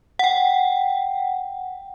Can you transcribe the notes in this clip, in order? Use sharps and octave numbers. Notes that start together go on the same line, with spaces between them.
F#5 G5